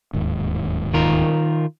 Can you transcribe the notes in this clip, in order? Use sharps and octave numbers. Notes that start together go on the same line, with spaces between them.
D1 D#2 G#2
D#3 F4 A#4